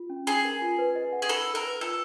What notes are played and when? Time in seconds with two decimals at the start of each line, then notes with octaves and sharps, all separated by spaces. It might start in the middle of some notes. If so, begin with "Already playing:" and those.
Already playing: F4
0.10 C#4
0.27 C#4 G#4
0.45 A#4
0.61 F4
0.78 B4
0.96 D#5
1.13 F#5
1.22 G#4
1.29 A4 B5
1.46 B5
1.55 A#4
1.64 B4
1.81 F4 A4